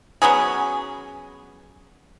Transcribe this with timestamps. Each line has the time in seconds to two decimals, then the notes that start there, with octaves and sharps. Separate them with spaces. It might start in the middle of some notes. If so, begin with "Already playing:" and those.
0.22 F#3 B3 C#4 G#4